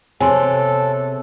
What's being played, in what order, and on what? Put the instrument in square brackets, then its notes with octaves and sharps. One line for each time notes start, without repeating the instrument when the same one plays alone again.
[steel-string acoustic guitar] C3 [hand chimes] G#4 C5 C#5 [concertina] A4 [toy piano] G#5 C6